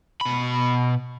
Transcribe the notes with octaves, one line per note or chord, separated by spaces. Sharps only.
B2 B5